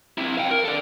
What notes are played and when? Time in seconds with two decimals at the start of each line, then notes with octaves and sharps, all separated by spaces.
0.18 C4 E4
0.37 F5 G5
0.51 A#4
0.64 A4 D5